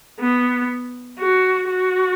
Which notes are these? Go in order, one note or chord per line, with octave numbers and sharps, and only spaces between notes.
B3
F#4
F#4